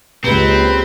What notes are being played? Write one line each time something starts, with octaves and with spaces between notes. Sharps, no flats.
C#2 A#3 C4 G4 G#4 B4